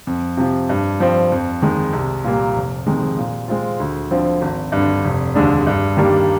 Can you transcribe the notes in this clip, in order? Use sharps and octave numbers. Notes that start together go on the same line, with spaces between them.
F2
C3 F3
G2
F3 C4
F2
D#3 G#3
C2
A#2 G3 A#3
F1
F2 D#3 G#3
A#2
G#3 C4 F4
D2
D3 F3 C4
G#1
G2 D3
F1
D#2 D3 G#3 D4
G2
D#3 G3 A#3 D4